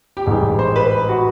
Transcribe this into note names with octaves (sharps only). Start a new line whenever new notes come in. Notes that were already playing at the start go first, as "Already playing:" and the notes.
G4
A1 G#2 E3 G3 G#4
C5
B4
F#4